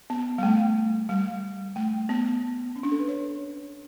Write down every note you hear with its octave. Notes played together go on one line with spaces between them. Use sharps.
B3
G3
A3
G3
A3
B3
C#4
D4
A4
B4
C#5